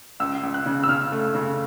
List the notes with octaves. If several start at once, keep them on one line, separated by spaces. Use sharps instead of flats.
C#2 E6
C#2
F#6
C#3
E6
C#3 F6
A3
C#3